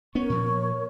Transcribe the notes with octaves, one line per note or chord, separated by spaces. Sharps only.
B3 C#4 A#4 C#5 C#6
A#2 F3